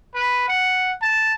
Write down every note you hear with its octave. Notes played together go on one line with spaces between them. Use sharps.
B4
F#5
A5